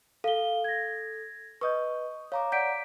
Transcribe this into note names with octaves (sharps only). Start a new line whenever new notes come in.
A4 F5 G7
G#6 A#6
B4 D#5 C#6 D#6 G6
C#5 F5 A#5 D6
D5 F#5 G6 B6 D7